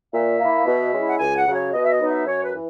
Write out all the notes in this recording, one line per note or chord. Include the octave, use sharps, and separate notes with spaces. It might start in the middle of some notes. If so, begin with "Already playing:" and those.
A#2 E5
A#3 E4
B2
G#3 C#4 E4
F#5
C#2 G#5
F#5
C#3 F#3
C#5
B2 D#5
E5
D#5
F#3 B3 D#4
E5
F#2 C#5
B4
E3